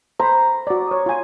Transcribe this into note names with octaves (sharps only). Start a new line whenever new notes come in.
C5 A#5 B5
F#4 D5
C#5 D#6
F4 G#5